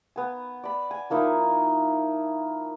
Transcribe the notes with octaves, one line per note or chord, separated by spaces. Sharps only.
B3 G#5
D5 B5
G#5
F3 A#3 D#4 E4